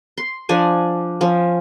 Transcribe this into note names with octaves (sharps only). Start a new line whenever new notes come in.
C6
F3 D4 G#5
F3 C#4